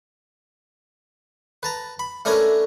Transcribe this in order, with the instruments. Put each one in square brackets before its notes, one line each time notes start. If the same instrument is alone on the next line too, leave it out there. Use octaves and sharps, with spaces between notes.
[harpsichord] B4 A5 A#5
B5
A3 C#4 D4 A#4 B4 G#5